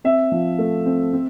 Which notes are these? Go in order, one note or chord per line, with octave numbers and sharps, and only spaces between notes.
C4 E5
F3
A3
C4
C4